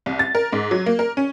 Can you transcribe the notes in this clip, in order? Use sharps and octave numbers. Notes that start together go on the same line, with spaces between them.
C2
A6
A#4
G#2
F#3
A#3
A#4
C#4